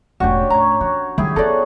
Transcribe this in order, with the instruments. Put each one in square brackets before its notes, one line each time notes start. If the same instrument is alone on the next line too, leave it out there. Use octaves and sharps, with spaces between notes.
[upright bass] E1 A2 [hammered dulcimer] C#4 D4 G4 [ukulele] F#4
[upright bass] A2 [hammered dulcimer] C#5 C#6 [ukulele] A#5
[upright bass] E3 [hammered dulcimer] F#4
[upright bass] D#3 G3 [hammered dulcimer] E4 G4 G#4
[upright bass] B3 F4 [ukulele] A4 B4 D5 [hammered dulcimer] C#5 F#5 A#5